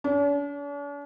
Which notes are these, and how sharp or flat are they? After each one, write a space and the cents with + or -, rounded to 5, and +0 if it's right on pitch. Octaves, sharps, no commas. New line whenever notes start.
D4 -45